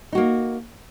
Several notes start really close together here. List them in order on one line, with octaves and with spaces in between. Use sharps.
D#4 F#4 A#3